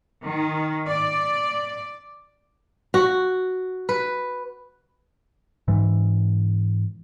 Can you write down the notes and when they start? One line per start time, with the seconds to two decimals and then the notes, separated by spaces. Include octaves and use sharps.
0.23 D#3
0.88 D5
2.94 F#4
3.89 B4
5.68 G#2 E3